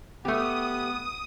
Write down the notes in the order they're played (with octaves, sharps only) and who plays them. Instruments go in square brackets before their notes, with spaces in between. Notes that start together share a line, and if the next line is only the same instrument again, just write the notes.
[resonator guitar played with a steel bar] A3 G4 [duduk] B3 [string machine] D#6